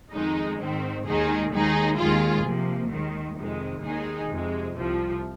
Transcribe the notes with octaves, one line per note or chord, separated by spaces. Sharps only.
F2 D#3 G#3 D#4
G#2 D#3 C4
D#2 D#3 G#3 D#4 G#4
D#2 D#3 G#3 D#4 G#4
D#2 D#3 G#3 F4 G#4
C3 F3 A#3
D#2 D#3 G#3
F2 C3 D#3 G#3
D#2 D#3 G#3 D#4 G#4
F2 C3 G#3
C2 C3 F3